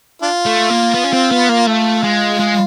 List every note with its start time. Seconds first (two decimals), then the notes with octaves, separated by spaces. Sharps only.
0.22 D4 F4
0.46 A3
0.70 A#3
0.94 B3
1.04 C#4
1.13 C4
1.31 B3
1.49 A#3
1.67 A3 F4
2.03 G#3
2.39 G#3